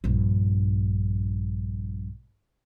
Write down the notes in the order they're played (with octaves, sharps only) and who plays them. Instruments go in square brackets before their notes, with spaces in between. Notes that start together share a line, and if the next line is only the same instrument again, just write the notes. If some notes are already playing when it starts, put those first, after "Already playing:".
[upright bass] A#1 G2